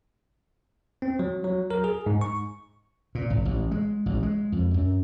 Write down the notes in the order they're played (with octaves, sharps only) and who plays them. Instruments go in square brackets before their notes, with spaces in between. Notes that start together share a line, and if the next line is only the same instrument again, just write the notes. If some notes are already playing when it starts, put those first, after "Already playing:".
[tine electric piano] C4
F#3
F#3
A#4
G#4
G#2
C#6
[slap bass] A#2
G#1
A1
G#3
A1
G#3
F2
F#2